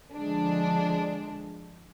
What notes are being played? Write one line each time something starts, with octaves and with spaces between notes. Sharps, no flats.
D3 F3 G#3 D4